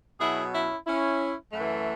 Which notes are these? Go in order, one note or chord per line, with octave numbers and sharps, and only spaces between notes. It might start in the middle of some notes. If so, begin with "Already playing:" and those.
B2 F#3 E4 G#4
C#4 E4
C#4 E4
F#2 E3 A3